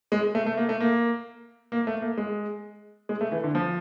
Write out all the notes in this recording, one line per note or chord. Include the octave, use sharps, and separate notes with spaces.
G#3
A3
A3
A#3
A3
A#3
A#3
A3
A#3
G#3
G#3
A3
E3
D3
F3